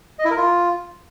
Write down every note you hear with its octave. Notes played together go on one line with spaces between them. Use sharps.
D#5
E4
A#4
F4